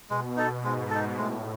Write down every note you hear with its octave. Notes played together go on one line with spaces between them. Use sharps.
B2 G#3
D#4 A4
G#2 G#3
D#4 A4
A2 G#3